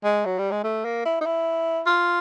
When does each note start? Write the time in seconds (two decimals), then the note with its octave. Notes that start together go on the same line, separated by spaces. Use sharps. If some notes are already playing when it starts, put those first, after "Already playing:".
0.04 G#3
0.25 F#3
0.39 G3
0.51 G#3
0.64 A3
0.85 A#3
1.05 E4
1.21 D#4
1.26 E4
1.87 F4